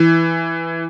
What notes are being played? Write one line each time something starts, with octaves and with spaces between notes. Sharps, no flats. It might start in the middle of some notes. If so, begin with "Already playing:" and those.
Already playing: E3